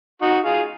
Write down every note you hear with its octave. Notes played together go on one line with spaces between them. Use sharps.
D#4 F#4
F4 G#4